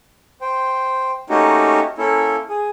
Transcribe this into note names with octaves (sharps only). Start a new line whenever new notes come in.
C5 G5
A3 A#3 C#4 D#4 F#4 G4
A#3 C#4 E4 A4
G#4